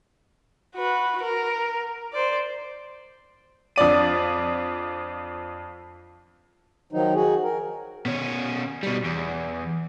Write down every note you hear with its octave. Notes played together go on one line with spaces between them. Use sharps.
F#4 B4
A#4
C5 D5
F2 D4 D5 D#7
D#3 F3 F#3 D#4
F#4 G#4
A#4
B2 C#4
B2 G3
E2